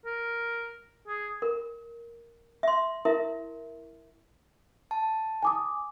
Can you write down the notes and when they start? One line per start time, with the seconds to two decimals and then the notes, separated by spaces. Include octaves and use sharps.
0.05 A#4
1.08 G#4
1.42 A#4
2.63 E5 C6
3.05 E4 A#4 E5
4.91 A5
5.42 G#5 D6 D#6